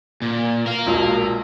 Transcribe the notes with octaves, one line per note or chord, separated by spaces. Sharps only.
A#2
A#4 F5
E1 B1 A#2